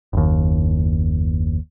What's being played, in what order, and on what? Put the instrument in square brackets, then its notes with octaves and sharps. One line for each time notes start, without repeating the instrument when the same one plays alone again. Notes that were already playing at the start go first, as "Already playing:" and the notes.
[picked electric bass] F#1 D#2